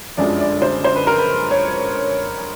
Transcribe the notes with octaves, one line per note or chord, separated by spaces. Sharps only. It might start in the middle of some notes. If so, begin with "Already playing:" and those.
G1 F#2 D3 F3 G#3 D5
D5
C5
C5
B4
A#4
B4
C#5